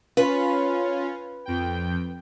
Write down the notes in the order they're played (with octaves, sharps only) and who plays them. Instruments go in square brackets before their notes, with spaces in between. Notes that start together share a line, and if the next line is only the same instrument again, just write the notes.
[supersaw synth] C#4 F4 [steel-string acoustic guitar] B4
[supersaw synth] F2 G5